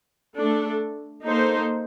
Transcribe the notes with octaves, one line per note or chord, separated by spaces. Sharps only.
A3 D4 A4
A#3 D#4 A4 C5